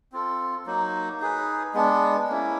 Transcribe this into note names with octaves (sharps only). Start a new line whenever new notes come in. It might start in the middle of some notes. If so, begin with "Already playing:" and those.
C4 F4 A4
F#3 A#3 D#4
D#4 G#4 B4
G#3 B3 D4
A#3 C#4 E4